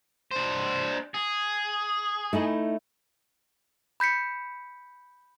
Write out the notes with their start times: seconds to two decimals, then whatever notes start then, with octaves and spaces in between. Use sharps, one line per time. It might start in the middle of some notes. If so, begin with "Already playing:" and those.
0.31 D4 C5
1.14 G#4
2.33 A3 D#4 E4
4.00 B5 G6 B6 C#7